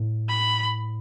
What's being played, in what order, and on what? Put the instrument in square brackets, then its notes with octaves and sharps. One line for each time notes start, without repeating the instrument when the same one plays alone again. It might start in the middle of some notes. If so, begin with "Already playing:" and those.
Already playing: [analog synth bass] A2
[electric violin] B5